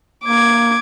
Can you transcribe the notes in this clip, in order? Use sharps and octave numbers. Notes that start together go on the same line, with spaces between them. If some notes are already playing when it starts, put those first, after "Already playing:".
A#3 D6 G#6